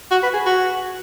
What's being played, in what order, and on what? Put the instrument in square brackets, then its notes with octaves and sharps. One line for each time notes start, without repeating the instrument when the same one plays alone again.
[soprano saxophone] F#4
B4
G#4
F#4